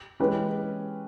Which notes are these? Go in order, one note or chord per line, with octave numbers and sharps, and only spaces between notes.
E3 G#3 C#4 G4 B4